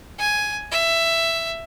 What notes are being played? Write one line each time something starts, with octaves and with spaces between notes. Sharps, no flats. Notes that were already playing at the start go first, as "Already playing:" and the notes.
G#5
E5